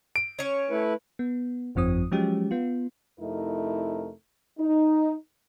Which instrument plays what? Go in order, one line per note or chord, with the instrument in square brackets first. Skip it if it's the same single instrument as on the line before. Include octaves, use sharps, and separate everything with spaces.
[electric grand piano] D7
[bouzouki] C#4 C#5
[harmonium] A3 E4 B4
[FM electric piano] B3
G1 F2 F3 C4 D#6
F3 F#3 G#3 C#4 G4
B3 F4
[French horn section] F2 C3 A3 D#4 E4 A#4
D#4